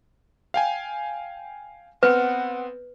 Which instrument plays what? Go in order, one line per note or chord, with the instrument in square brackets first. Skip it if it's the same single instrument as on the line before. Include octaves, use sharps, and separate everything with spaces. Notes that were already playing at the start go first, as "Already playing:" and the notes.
[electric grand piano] F5 G5 G#5
[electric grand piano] B3 C4 [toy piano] B4 [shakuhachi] F#5